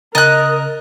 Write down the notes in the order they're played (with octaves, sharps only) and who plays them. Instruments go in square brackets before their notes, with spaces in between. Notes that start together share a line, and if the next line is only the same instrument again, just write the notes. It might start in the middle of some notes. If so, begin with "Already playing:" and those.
[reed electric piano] C#3 A#5 A6 [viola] A#4 [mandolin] D#5 F#6